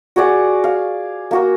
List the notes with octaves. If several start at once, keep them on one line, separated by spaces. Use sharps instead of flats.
F#4 G#4 D5 F#5
F5
A#3 F#4 A#4